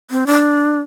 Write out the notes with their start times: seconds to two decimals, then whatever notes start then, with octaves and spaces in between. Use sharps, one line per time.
0.11 C4
0.27 D4